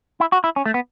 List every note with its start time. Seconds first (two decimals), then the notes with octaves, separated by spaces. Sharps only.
0.20 E4
0.32 F#4
0.44 E4
0.56 C#4
0.66 A3
0.74 B3